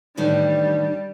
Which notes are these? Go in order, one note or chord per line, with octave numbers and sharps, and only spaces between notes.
A2 D#3 E3 G3 D4